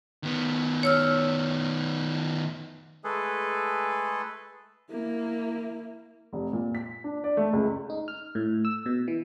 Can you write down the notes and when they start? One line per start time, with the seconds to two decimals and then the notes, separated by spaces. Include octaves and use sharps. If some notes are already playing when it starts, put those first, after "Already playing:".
0.23 D#3 B3
0.83 C#5 E6 F6
3.04 G#3 A3 G#4 A4 B4
4.90 A#3 E4
6.33 F1
6.53 A#2
6.75 B6
7.04 D4
7.24 D5
7.37 A3
7.53 C#2
7.90 D#4
8.08 F6
8.35 A2
8.65 E6
8.86 B2
9.08 E3